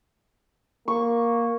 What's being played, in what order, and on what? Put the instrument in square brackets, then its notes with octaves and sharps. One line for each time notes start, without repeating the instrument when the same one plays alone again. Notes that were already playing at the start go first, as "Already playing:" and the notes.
[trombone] A#3 [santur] C#6